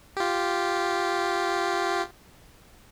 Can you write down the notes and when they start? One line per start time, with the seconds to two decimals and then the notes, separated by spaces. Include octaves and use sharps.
0.17 F4 G4